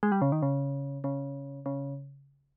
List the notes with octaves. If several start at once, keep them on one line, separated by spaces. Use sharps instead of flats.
G#3
G3
C#3
D#3
C#3
C#3
C#3